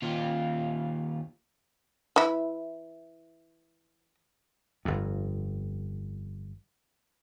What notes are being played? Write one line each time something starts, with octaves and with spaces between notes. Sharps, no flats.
D#2 F4
E3 E4
G1 F2